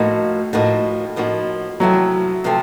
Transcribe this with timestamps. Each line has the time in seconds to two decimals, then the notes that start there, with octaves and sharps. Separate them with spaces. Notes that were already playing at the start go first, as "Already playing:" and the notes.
Already playing: A2 F3 A3 A#3 D#4 F#4
0.53 A2 F3 A#3 D#4 F#4
1.16 A2 F3 A#3 D#4 F#4
1.80 C3 F3 F#3 A3 C4 E4
2.44 C3 F3 A3 C4